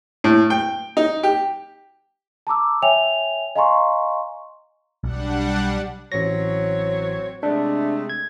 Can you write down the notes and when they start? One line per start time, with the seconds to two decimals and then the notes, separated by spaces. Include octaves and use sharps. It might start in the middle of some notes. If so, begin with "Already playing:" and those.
0.24 A2
0.50 G5
0.97 D#4
1.23 G4
2.47 A5 A#5 D6 E6
2.82 C#5 E5 G5 G#5 F7
3.55 D#5 F5 G#5 A#5 C6 C#6
5.04 B1 G3 D4 F#5
6.12 A1 F#3 C4 C#5 A#6
7.43 C3 G#3 A3 D4
8.09 G#6